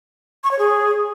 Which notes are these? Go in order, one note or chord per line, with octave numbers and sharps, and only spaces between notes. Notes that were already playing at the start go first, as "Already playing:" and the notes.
C#6
C#5
G#4